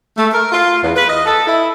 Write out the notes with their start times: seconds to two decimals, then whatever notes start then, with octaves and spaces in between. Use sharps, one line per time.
0.17 A3
0.32 A#4
0.52 F4
0.82 E2
0.96 B4
1.08 D#5
1.26 A4
1.47 E4